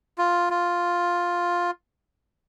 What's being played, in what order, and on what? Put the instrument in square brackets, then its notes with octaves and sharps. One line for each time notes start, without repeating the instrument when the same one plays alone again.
[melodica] F4
F4